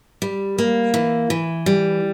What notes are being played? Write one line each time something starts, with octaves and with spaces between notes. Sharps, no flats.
G3
A#3
E3
E3
G3